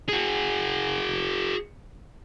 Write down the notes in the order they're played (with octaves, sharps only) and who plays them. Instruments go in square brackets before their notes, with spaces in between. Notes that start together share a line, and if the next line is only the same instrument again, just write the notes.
[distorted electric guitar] F#4 G#4